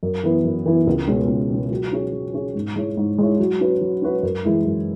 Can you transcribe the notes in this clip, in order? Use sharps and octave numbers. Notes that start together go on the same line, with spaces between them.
F#2
E3 B3 E4
F#2
E3 B3 E4
C#2
B2 G#3 C#4
C#2
B2 G#3 C#4
F#3
C#4 G#4 C#5
F#3
C#4 G#4 C#5
G#2
G#3 E4 C#5
G#2
G#3 E4 C#5
F#3
C#4 F#4 B4
F#3
C#4 F#4 B4
F#2
E3 G#3 E4
F#2